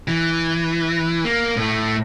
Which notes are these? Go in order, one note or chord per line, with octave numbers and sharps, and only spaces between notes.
E3
A#3
A2 A3